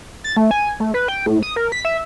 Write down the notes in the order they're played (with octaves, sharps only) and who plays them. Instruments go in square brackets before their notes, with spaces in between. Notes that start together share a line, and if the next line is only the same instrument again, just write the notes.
[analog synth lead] A6
A3
G#5
A3
B4
G5
A2
D#6
A#4
B6
E5